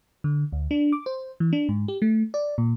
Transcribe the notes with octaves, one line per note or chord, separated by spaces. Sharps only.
D3
D2
D4
D6
C5
E3
D4
G#2
G4
A3
D5
A#2